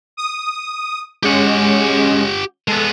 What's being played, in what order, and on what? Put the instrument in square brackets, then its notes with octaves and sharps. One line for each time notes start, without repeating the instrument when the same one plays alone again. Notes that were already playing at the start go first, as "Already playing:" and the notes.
[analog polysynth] D#6
[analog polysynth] G#3 C#4 [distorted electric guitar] G4 F#5
[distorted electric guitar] G#3 B3 [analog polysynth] A4